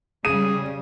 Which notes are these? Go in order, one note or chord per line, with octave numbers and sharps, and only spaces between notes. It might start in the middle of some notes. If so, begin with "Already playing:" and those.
C#3 G3 G#4 D#7